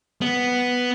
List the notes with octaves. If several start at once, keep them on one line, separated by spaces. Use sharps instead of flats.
B3